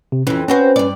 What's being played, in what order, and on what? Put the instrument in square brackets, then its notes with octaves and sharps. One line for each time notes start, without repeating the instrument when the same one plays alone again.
[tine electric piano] C3
[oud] F2 E3 [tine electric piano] C#4
[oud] C4 F#4 C5 [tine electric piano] C#4 B4
[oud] G2 D5